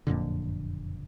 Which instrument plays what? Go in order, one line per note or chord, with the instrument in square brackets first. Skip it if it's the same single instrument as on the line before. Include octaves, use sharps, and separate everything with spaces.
[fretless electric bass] F#1 F2 A#2 D3